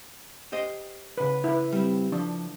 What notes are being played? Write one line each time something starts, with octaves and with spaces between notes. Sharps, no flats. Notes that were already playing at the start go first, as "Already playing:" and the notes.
G4 C5 D#5
C#3 B4
E4 B4
G3 C4
F3 D4